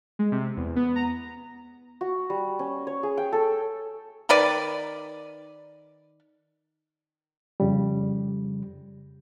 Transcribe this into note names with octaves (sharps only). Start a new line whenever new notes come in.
G#3
C3
E2
B3
A#5
F#4
G3
C#4
C#5
G#4
G5
A4
D#3 A#4 B4 D5
F2 C#3 G3